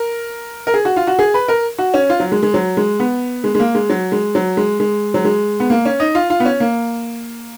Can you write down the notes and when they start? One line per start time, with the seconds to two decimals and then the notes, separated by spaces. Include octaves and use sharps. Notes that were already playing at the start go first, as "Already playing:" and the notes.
Already playing: A#4
0.67 A#4
0.74 G#4
0.85 F#4
0.96 F4
1.07 F#4
1.19 G#4
1.34 B4
1.48 A#4
1.78 F#4
1.94 C#4
2.10 F4
2.20 F#3
2.32 G#3
2.43 G#3
2.54 F#3
2.77 G#3
3.00 B3
3.44 G#3
3.55 G#3
3.60 A#3
3.75 G#3
3.90 F#3
4.12 G#3
4.35 F#3
4.57 G#3
4.80 G#3
5.14 F#3
5.25 G#3
5.60 B3
5.70 A#3
5.85 C#4
6.00 D#4
6.15 F4
6.30 F4
6.40 B3
6.45 C#4
6.60 A#3